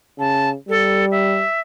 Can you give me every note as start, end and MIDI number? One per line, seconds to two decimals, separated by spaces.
0.19 0.56 49
0.19 0.49 81
0.69 1.45 55
0.69 1.05 69
1.11 1.60 76